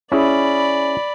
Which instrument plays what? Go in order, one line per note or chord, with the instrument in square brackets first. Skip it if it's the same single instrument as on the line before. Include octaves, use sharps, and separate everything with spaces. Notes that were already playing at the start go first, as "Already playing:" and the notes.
[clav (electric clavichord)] C#4 E4 G#4 [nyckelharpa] D5 B5